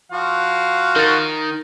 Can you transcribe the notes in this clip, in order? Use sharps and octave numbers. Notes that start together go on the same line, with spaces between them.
F3 F#4 F5
D#3 A#4 A6